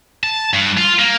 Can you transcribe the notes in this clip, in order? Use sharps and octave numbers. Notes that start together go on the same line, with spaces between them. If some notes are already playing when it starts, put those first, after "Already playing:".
A5
G2
F4
A#3